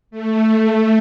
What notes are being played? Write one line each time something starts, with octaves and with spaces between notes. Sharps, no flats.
A3